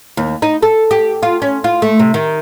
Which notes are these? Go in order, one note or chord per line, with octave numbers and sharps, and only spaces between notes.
D#2
D#4
A4
G4
F4
C#4
F4
A3
C3
D#3